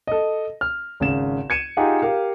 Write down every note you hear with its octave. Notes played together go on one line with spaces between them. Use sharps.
A4 D#5
F6
G#1 C#3 E7
G#6 C#7 D#7 E7
D#4 F4 G4 G#4 F5 F#5
G4 A#4 F5